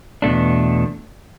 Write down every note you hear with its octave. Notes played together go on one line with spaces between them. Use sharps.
E2 B2 A3 D4